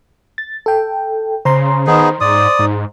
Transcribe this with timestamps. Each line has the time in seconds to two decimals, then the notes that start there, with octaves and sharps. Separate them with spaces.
0.38 A6
0.66 A4 G5
1.45 C#3 C5 A#5 C6
1.87 D#3 B3 D#4 G#4
2.21 G#2 D5 D#6
2.59 G#2